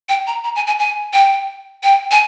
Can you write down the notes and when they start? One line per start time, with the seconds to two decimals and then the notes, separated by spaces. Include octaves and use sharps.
0.09 G5
0.27 A#5
0.44 A#5
0.56 G#5
0.67 G#5
0.79 G#5
1.13 G5
1.83 G5
2.11 G#5